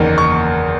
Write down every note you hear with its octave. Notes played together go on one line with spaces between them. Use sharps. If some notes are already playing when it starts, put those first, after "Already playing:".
Already playing: F#1 E2 D#3 A#3
C#6